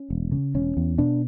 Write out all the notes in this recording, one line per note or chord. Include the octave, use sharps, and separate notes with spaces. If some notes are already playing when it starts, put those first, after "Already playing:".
Already playing: C#4
E1
C#3
E1 C#4
E2
B2 D4